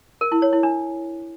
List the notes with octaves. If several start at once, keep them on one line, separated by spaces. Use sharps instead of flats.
A#4
E4
C#5
E4
D4